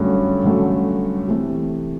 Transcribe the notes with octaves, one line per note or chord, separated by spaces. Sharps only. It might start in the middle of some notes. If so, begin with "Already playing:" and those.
Already playing: G2 D3 F#3 A3 C#4
G2 D3 F#3 A3 C#4
C3 E3 A3